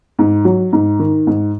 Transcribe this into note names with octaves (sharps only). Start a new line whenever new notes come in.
G#2
F#3
G#2
D#3
G#2